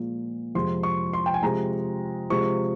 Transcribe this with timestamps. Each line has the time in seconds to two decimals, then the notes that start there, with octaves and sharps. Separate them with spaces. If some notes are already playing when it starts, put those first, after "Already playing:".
Already playing: A#2 F3 G#3
0.55 F2 C3 F3 G#3 C6
0.83 C#6
1.13 C6
1.26 G5
1.34 G#5
1.43 C3 F3 G#3 A#5
2.30 C3 F3 G#3 C#6